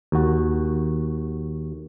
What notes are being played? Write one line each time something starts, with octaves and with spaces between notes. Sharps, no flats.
D#2 F#4